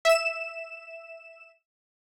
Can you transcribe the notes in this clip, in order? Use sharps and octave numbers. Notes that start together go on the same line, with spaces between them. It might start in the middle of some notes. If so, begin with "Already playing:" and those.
E5 E7